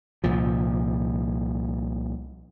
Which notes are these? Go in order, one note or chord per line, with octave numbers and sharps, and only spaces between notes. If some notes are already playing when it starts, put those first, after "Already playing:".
C2 A#2 F3